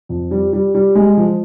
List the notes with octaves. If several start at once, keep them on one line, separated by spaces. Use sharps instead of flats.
F2
G3
G3
G3
G#3
F3